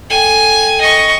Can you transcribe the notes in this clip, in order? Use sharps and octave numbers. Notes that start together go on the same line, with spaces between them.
A4 G5 G#5
D#5 C#6